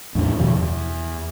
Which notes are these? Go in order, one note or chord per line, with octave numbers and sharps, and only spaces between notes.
E2 A2 C#4 D4
G2 B2 D#3 F3
E2